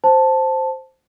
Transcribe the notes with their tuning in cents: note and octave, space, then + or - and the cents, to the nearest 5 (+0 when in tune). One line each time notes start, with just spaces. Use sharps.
C5 +0 A5 +0